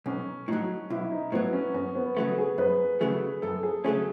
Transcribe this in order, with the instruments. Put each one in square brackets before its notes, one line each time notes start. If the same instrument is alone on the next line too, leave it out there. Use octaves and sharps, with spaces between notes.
[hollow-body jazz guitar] B1 [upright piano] C#4
[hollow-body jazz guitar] A2 F#3 [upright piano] D#4
[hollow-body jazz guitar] B1 [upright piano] E4
[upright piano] D#4
[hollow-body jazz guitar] A2 F#3 [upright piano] B3
[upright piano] C#4
[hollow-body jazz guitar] F#2 [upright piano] C#4
[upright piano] B3
[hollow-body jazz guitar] C#3 F#3 A3
[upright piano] G#4
[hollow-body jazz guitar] F#2 [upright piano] B4
[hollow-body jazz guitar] C#3 F#3 A3 [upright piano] G#4
[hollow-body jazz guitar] F#2 [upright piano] A4
[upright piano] G#4
[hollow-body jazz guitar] C#3 F#3 A3 C#4 [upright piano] G#4